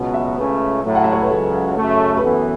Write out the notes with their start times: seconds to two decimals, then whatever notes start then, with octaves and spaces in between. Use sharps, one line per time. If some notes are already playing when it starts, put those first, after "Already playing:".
Already playing: C#2 B2 F#3 B3
0.14 E5
0.37 C#2 C#3 A3 C#4 B4
0.84 A2 F#3 A3
0.95 F#5
1.04 E5
1.13 C#5
1.21 B4
1.30 C#2 C#3 F#3 A4
1.77 F#2 C#3 A3
2.17 B4
2.23 F#2 E3 B3 A4